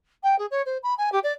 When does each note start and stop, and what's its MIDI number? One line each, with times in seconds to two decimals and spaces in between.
0.23 0.38 79
0.38 0.46 68
0.51 0.62 73
0.66 0.77 72
0.83 0.94 83
0.98 1.12 80
1.12 1.19 67
1.23 1.32 74